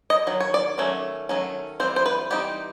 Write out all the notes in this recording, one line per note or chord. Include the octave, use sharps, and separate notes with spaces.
D#5
D#3 F#3
C#5
D5
D#3 F#3 A3 C#4
D#3 F#3 A3 C#4
E3 G3 C4 C5
C5
B4
E3 G3 C4 D#4 G4